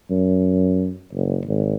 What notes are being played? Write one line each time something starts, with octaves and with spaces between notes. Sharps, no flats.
F#2
F#1
G#1